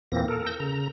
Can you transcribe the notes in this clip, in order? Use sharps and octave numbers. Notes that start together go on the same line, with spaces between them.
E2 A#2 E3 A#3 C4 A#6
A4 A#4
E6 G6 A#6
C#3 A#5